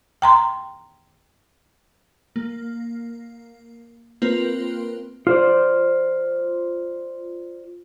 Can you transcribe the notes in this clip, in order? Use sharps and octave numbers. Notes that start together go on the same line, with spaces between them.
G5 A#5 C6
A#3
A#3 C4 F4 A#4 B4
F4 C5 D5